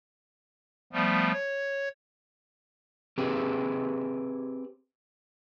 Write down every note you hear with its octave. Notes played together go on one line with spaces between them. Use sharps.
F3 G3 A3 B3
C#5
C4 G4 G#4 B4